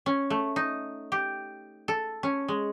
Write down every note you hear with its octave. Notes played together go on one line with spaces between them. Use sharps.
C#4
A3
D#4
G4
A4
C#4
G#3